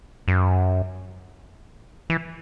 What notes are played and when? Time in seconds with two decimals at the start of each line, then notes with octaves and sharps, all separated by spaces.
0.28 F#2
2.10 E3